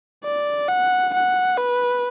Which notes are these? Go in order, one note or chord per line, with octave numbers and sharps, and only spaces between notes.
D5
F#5
F#5
B4